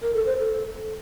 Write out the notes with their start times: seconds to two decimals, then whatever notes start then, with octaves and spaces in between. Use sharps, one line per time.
0.02 A#4
0.14 A4
0.26 C5
0.38 A4